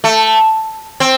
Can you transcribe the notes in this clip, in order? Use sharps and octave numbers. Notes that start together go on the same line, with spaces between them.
A3
C4